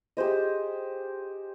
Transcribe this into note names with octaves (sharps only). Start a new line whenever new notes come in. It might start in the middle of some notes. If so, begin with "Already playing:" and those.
G4 G#4 C5 D#5